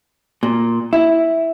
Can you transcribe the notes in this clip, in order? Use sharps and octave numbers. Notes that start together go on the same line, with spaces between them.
A#2
E4